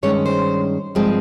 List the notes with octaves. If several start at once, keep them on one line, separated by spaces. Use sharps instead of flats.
G2 D#3 G#3 C#4 C#5
C5
G2 F3 G#3 C4